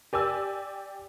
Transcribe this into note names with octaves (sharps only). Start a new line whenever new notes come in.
G4 D5 G#5 E6